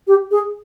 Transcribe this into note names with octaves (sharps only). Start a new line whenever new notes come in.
G4
G#4